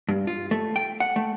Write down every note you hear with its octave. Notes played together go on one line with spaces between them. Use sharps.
G2
F4
A3
G5
F#5
A3